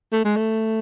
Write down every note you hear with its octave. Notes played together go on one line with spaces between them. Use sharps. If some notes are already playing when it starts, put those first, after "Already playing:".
A3
G#3
A3